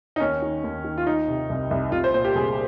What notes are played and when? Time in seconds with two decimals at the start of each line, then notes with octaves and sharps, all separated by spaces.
0.16 D#4
0.20 D#2 C#4
0.42 D#3
0.64 D#2
0.84 D#3
0.98 F4
1.06 D#3 D#4
1.28 C3
1.50 C2
1.71 C2
1.92 C2 F4
2.04 C5
2.14 A#2 C5
2.25 G4
2.35 C2 G#4